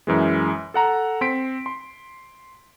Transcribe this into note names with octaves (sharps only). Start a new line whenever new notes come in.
F#2 E3 G#3
A4 F#5 A#5
C4 C6 B6 D7
C6